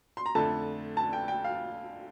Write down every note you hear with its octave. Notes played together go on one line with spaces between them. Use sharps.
C6
A#5
F2 D3 A3 A5
A5
G5
G5
F5